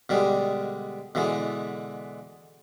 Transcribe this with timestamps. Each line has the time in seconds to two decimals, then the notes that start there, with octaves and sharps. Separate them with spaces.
0.09 B2 D3 G3 G#3
1.15 B2 D3 E3 G#3